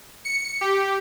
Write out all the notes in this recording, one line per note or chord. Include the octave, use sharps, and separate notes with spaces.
C#7
G4